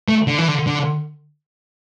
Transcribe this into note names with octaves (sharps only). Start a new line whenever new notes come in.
A3
D3
E3
D3
D3